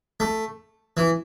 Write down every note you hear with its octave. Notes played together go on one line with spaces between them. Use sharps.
A3
E3